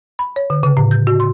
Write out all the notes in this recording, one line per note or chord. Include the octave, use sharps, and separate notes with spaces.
B5
C#5
D3
C#3
A2
G6
F#4
C6